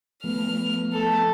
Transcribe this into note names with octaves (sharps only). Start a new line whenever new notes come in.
F3 A3 B3 F6
A4